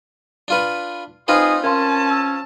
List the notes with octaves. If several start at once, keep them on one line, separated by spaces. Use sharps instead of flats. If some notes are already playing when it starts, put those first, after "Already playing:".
D4 F4 B4
C4 D#4 F4 G#4 B4
C#4 A#4 F5 A5 C6
E6